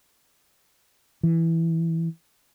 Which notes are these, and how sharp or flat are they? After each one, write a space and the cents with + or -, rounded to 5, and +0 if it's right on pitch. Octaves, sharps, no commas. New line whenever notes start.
E3 +0